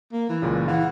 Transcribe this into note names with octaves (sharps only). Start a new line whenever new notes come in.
A#3
E3
C#2 A#2 C#3
E3 F5 F#5